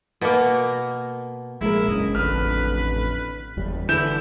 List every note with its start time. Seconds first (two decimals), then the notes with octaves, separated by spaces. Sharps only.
0.21 B2 A#3
1.61 A#1 G#3 E4 A#4
1.88 E1 F#2 C#3 D#5
2.15 A1 F2 D3 B4 F6
3.57 F#1 E2 G3
3.89 D3 E3 E4 G6 E7